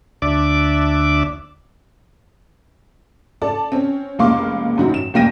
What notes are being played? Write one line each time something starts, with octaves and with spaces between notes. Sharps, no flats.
D2 D4 D5 E5 D6
A4 D5 A5
C4 C#4
F1 C#2 A#3 F5 C6 D6
F1 F#2 D#3 F#4
E7
F1 B1 A#3 G5 A#6 D#7